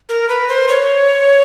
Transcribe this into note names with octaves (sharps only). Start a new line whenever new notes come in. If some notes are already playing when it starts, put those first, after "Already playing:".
A#4
B4
C5
C#5